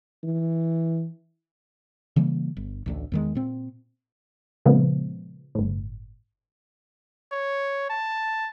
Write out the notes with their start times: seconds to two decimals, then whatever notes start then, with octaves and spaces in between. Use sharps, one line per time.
0.24 E3
2.16 C#3 E3 G3 A#3
2.57 G1
2.86 A1 D2 D3
3.12 E2 D#3 G#3
3.35 A#2 C4
4.65 A#2 C#3 F3 G#3 B3
5.55 G1 A2
7.32 C#5
7.90 A5